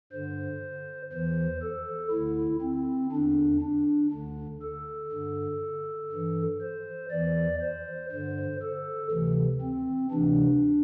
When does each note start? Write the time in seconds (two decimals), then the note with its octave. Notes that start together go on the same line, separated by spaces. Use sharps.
0.12 G2 D3 C5
1.12 E2 E3 C5
1.62 A4
2.11 D2 D3 E4
2.62 C4
3.12 E2 D3 D4
3.62 D4
4.12 D2 D3
4.62 A4
5.12 G2 D3
6.12 G2 E3
6.61 C5
7.11 E2 E3 D5
7.61 C5
8.11 G2 D3 C5
8.62 A4
9.11 D2 C3 E3
9.61 C4
10.11 D2 C3 E3 D4